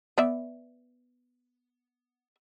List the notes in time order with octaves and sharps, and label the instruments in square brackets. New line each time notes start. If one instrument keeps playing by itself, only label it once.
[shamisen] B3 D5 E5